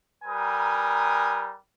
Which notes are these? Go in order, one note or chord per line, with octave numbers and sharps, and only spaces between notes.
G3 A#4 B4 G#5 A#5 D#6